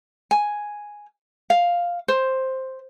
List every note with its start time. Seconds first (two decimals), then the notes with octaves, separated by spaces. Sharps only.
0.31 G#5
1.50 F5
2.08 C5